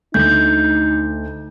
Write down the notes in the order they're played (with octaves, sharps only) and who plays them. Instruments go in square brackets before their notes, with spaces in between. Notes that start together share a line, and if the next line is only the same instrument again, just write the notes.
[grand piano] D2 [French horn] D#4 [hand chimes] G6